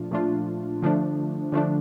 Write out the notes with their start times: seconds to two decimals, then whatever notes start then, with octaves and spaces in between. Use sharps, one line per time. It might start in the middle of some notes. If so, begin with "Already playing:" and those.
Already playing: A#2 F3 A3 D4 F4
0.11 A#2 F3 A3 D4 F4
0.82 D3 F3 A3 D4
1.52 D3 F3 A3 D4